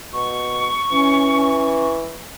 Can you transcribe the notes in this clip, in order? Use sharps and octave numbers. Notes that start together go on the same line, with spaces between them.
B2 C#6
E3 C#4